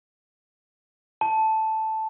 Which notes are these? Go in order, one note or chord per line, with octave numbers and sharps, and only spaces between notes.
A5